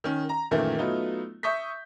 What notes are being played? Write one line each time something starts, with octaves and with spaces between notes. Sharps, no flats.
D#3 C#4
A#5
F#2 A#2 D#3 E3 A3 A#3
F#3 A3 B3 D#4 F4
E5 C#6 D#6 G6 B6